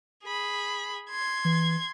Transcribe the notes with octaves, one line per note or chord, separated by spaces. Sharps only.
G#4 B5
C6 G#6
E3